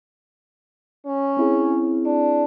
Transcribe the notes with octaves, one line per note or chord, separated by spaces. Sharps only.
C#4
C4 E4 G#4
D4